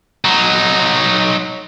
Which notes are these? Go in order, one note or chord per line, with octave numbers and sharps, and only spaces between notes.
F#3 D#4